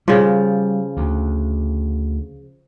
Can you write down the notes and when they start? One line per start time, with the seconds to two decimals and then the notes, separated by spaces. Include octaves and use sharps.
0.08 C#3 F3 G3
0.97 D2